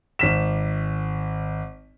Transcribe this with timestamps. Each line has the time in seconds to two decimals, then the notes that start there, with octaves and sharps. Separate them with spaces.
0.19 G#1 B6 E7